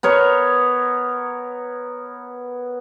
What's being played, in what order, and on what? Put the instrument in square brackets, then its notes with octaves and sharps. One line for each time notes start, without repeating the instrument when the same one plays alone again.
[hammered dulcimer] B3 A#4 C#5